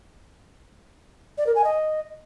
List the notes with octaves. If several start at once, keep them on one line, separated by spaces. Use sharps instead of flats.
D5
A#4
G#5
D#5